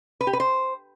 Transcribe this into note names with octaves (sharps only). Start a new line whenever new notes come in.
B4
G4
B4
C5